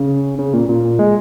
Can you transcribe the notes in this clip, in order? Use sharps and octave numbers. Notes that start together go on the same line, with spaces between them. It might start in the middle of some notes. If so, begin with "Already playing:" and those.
Already playing: C#3
C#3
A#2
A#2
G#3